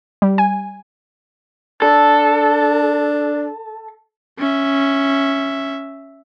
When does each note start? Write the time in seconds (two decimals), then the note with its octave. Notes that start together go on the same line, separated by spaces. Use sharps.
0.22 G3
0.38 G#5
1.82 D4 A4
4.38 C#4 E5